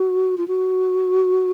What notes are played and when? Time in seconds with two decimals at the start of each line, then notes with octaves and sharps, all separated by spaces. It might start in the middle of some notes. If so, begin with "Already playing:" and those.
Already playing: F#4
0.38 F4
0.48 F#4